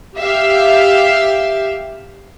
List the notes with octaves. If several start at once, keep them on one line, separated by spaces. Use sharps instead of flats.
G4 E5 F5